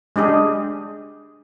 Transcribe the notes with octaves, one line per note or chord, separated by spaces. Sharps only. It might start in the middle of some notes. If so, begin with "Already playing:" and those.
G#3 D4 G4 G#4